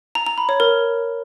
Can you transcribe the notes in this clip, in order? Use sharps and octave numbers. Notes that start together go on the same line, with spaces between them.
A#5
A#5
B5
C#5
A#4